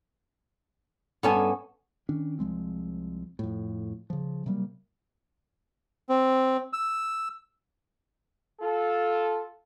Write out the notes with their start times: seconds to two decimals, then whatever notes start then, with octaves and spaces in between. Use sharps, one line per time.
1.23 G2 B3 C#4 A4 G#5 A5
2.09 D#3 C#4 D4
2.39 C2 F3 G#3 C4
3.39 F2 A2
4.10 C#3 F3
4.46 C3 F#3 G3 A#3
6.09 C4
6.73 E6
8.60 F4 A4